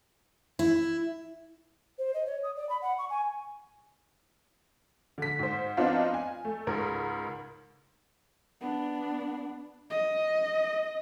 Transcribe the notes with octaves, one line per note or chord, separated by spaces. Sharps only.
E4
C5
D#5
C#5
D#6
D5
B5
F#5
C#6
G#5
D3 B6
G#2 C5
F3 B3 C4 D4 D#4 F4
G#5
A3
C#2 G#2 A#4
B3 D4
D#5